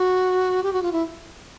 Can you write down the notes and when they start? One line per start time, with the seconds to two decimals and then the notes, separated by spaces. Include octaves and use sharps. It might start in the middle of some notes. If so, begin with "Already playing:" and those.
Already playing: F#4
0.63 G4
0.73 F#4
0.83 F4
0.93 E4